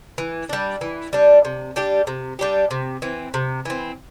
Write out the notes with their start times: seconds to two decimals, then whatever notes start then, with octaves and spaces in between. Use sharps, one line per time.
0.18 E3
0.49 G3 D4
0.81 E3
1.13 G3 D4
1.45 C3
1.76 G3 D4 G4
2.07 C3
2.39 G3 D4 G4
2.71 C3
3.02 E3 C4
3.34 C3
3.65 E3 C4